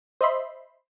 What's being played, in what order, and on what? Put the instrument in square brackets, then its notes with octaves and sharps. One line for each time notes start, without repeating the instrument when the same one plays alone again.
[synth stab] C5 D#5 E5 B5 C6